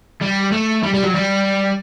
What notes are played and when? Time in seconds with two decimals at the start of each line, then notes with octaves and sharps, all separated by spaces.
0.21 G3
0.52 A3
0.83 G3
0.94 G3
1.04 F#3
1.14 G3